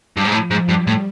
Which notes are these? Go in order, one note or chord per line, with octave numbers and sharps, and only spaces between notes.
G2
G#2
A2 F3
G#2
G2 G3
A2